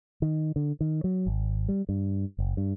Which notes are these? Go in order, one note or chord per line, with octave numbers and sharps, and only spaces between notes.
D#3
D3
D#3
F#3
G#1
G3
G2
F#1
G2